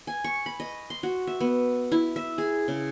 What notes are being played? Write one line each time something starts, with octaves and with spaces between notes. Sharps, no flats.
G#5
C#6
B5
D#5
C6
F#4
E5
B3
E4
E5
G#4
C#3